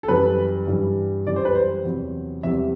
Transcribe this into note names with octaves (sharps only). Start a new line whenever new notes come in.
A4
F#2 E3 G3 B4
G2 E3 G3
F#2 E3 G3 D5
C5
B4
C5
E2 C3 F#3
E2 C3 G3 E5